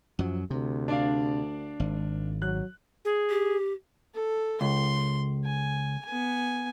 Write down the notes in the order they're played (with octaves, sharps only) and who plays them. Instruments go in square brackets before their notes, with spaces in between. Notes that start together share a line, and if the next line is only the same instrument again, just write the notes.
[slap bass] F#2 F#3 [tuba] F3
[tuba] D2 [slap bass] C3
[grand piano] D4 D5 F5
[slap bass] G#1
[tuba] F#3 [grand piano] F#6
[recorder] G#4
[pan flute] G4
[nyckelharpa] A4
[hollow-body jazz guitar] C#2 [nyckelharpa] C6
[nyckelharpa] G#5
B3 G#5